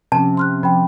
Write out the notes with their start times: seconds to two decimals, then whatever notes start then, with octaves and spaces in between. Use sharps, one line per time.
0.12 C3 F3 C#4 A5
0.37 C6 F6 F#6
0.63 F3 G5 B5